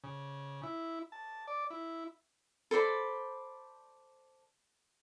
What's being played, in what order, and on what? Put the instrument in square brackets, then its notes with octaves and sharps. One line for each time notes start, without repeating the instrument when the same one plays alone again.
[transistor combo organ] C#3
E4
A5
D5
E4
[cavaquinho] A4 C5 D5 B5